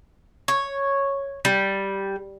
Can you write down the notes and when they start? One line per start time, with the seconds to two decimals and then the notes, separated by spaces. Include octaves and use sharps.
0.48 C#5
1.45 G3